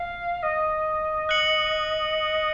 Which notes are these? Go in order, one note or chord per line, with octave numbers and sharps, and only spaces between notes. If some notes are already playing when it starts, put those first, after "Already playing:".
Already playing: F5
D#5
F#6 C#7 F#7